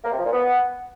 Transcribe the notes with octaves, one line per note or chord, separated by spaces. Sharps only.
A#3
C3
F3
A#2
B3